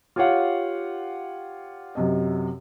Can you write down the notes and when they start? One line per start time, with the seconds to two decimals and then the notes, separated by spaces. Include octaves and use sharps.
0.16 F4 G4 C#5 F5 F#5
1.95 F#2 C3 D#5